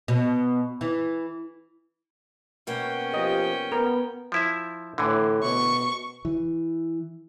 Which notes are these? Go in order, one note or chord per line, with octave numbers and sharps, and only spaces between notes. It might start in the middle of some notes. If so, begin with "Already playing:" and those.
B2
E3
B2 A#3 C#4 F#4 G5
F3 G4 D#5
B3 A#4
F3 E4 E5
A2 D3 E3
B2 C#6
E3